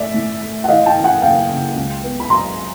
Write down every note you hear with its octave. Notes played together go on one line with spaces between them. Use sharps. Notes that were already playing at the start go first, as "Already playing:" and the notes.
Already playing: A3 D5 E5
A2
A3
F#5
E3 D#5 F5
G5 A5
E3
F#5 G#5
F#1 F5 G5
C#3
C#2
B3
B5
F#3 A#5 C6